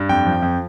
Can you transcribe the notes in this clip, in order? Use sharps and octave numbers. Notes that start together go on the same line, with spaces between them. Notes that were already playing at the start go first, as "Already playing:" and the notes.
Already playing: G2
F2 G5
F3
F2